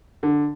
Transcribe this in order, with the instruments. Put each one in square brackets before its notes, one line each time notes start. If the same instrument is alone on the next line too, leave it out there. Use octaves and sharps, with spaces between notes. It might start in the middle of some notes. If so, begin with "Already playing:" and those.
[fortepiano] D3